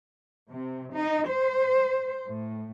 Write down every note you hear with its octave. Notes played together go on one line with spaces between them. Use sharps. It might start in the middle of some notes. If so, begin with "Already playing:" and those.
C3
D#4
C5
A2